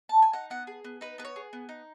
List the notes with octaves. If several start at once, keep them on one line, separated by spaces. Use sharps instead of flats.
A5
G#5
D#4 F#5
B3 F#5
G#4
B3
D#4 B4
B3 B4
C#5
G#4
B3
D#4